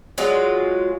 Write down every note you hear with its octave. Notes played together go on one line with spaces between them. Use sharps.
F#3 G#3 F4 F#4